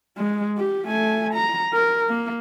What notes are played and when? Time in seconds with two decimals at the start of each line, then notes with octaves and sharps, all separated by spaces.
0.18 G#3
0.58 G4
0.88 A3 G#5
1.34 A#5
1.73 A#4
2.09 A#3